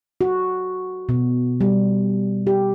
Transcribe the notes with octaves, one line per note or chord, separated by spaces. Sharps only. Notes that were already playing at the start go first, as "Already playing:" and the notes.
F#4
B2
G3
G4